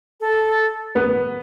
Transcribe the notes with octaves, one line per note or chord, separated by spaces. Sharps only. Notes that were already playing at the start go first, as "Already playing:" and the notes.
A4
B3 B4